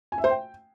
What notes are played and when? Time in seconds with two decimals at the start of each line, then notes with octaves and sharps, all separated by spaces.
0.12 G#5
0.18 E5
0.24 C5
0.30 G5